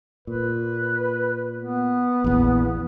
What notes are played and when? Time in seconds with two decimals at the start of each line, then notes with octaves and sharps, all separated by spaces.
0.27 A#2 B4
1.58 B3
2.24 A#1 E2